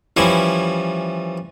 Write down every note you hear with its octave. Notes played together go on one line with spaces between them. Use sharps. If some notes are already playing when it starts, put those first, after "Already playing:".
E3 F3 G3 C#4 E4